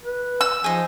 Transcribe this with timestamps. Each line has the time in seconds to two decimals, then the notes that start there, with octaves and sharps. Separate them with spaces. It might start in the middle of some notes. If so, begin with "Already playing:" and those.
0.03 B4
0.41 E6
0.64 F3 D#4 G#4